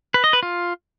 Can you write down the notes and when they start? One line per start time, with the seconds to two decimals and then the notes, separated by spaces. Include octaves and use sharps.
0.14 B4
0.24 D#5
0.33 B4
0.43 F4